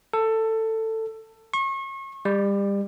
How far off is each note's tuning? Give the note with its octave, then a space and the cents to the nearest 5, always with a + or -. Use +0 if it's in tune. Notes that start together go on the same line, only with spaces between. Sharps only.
A4 +15
C#6 -35
G3 +30